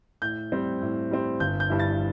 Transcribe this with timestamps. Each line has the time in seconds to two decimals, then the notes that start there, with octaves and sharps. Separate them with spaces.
0.22 A2 G6
0.52 G3 C4
0.82 A2
1.11 G3 C4
1.40 G1 G6
1.60 G6
1.70 G2 G3 E4
1.79 A6